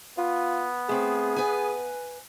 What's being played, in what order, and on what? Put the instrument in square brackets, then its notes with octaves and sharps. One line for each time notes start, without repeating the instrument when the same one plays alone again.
[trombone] B3 [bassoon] F4
[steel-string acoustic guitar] A3 C4 [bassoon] G#4
[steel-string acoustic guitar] B4 G#5